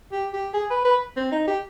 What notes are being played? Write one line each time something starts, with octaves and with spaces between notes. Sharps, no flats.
G4
G4
G#4
B4
B4
C4
D#4
G4